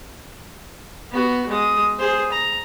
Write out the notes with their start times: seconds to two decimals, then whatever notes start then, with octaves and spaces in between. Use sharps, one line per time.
1.11 B3 F#4
1.48 G#3 D#6
1.99 G#4 C5
2.32 A#5